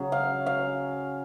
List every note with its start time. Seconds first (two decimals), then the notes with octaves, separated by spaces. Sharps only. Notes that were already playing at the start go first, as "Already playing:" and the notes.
Already playing: C#3 F#3
0.12 F5
0.46 F5